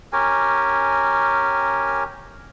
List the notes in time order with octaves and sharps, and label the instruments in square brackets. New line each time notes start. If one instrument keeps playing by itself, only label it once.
[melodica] C#4 G4 A#4 G#5